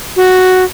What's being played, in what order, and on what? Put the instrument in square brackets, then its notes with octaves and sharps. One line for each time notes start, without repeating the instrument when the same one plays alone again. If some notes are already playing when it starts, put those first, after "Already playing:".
[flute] F#4